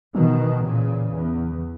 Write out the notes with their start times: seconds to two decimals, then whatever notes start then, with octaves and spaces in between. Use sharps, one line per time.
0.14 B2 D#3 E3
0.63 A#2 C#3
1.12 E2